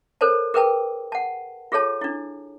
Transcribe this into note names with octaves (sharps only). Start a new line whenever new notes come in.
A4 A#4 C5 C#5 A5
G#4 A#4 B4 G5 A5
F#5 A5
F4 G#4 A4 C#5 A5
D4 E4